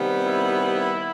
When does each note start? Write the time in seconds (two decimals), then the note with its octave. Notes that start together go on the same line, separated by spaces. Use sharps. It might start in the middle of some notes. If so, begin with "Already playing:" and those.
Already playing: C3 D#3 G3 B3
0.26 E4